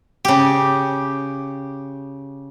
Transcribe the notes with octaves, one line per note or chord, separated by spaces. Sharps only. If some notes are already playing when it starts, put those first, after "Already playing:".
C#3 G4